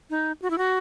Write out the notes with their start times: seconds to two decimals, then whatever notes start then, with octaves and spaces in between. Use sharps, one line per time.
0.10 D#4
0.42 F#4
0.50 E4
0.58 F#4